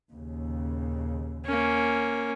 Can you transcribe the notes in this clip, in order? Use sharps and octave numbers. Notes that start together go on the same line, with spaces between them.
D#2 A#2 C#3
A#3 C#4